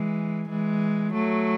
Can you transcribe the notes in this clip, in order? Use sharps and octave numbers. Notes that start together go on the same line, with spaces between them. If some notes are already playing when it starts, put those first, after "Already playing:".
Already playing: E3 G#3
E3 G#3
F#3 A3